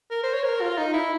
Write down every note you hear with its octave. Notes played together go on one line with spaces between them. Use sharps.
A#4
C5
C#5
A#4
F4
D#4
E4